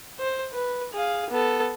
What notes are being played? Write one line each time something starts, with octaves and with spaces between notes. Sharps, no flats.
C5
B4
G#4 F5
B3 A4